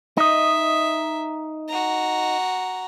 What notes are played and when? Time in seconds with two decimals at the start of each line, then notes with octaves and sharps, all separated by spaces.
0.17 D#4 D#5 E5
1.69 F#4 A#5